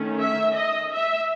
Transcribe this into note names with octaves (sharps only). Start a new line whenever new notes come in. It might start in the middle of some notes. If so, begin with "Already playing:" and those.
Already playing: D#3 A3 C#4
E5
D#5
E5